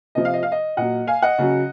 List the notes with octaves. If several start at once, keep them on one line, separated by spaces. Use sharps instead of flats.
C3 F3 D#5
F5
D#5
F5
D#5
A#2 F#3 D#5 F#5
F5 G#5
D#5 F#5
C#3 F#3